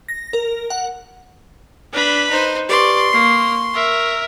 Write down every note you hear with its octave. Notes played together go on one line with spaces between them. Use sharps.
A#6
A#4
F#5
D4 B4 B5
D#4 C5
G4 B4 D5 C6 C#6
A#3 C#6 C7
A#4 E5